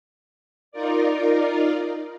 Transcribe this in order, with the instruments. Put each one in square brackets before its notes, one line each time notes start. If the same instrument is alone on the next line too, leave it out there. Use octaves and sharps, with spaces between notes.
[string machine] D#4 F4 A#4 D5